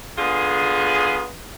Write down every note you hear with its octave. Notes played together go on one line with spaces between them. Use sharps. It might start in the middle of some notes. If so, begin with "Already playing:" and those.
D3 B3 F4 G#4